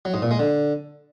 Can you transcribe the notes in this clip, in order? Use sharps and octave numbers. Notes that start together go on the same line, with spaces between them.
F#3
G#2
A#2
G#3
D3